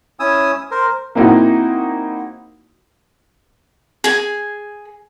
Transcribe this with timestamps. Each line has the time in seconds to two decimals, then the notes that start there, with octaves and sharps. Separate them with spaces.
0.20 C#4 E4 G#5 D#6 E6
0.71 A#4 C5
1.15 A#3 C4 D#4 E4 F#4 F#5
4.04 G#4 G#5